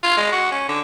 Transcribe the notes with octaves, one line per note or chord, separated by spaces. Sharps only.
F4
G#3
F#4
C#4
D3